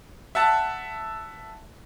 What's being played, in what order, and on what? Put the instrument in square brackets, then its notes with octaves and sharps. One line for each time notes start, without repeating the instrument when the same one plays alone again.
[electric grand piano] E5 F#5 A5